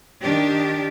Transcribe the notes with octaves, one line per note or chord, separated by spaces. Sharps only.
D#3 D4 G4